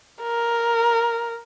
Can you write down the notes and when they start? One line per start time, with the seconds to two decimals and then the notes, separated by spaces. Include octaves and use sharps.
0.22 A#4